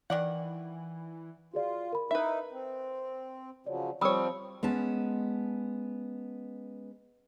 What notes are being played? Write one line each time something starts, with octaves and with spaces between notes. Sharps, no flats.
D#3 E3 D5 F#5
F4 F#4 G#4 D5
A#4 B5
D#4 E4 B4 E5
C4
C#3 F3 F#3 C#5 D5
F3 G3 C4 C#5 B5 D#6 E6
G#3 B3 C#4 A5